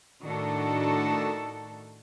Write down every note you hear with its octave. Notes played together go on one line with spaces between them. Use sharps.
A2 D#3 D4 F#4 A4